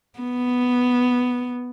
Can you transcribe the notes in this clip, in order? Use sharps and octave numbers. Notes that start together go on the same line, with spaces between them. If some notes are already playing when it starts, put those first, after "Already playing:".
B3